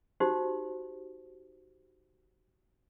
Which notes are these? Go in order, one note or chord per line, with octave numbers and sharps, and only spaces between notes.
D#4 F#4 G4 C5